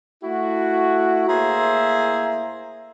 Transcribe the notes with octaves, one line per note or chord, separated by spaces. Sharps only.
A3 E4 F#4
A2 A#3 G#4 C5 E5 A#5